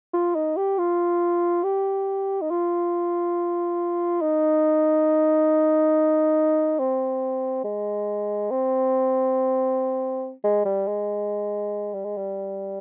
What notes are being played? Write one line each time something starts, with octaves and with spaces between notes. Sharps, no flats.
F4
D#4
G4
F4
G4
D#4
F4
D#4
C4
G#3
C4
G#3
G3
G#3
G3
G#3
G3